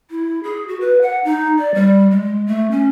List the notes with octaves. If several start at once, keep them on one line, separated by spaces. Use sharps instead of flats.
E4
G#4
F#4
B4
F#5
D#4
D5
G3
G#3
A3
C#4